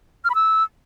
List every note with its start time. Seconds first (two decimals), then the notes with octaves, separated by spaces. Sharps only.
0.25 F6
0.30 B5
0.35 E6